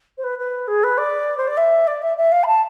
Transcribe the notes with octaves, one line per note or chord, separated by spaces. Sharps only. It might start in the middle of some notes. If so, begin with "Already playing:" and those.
C5
B4
B4
G#4
B4
D5
C5
D5
E5
D5
E5
E5
F5
B5
A5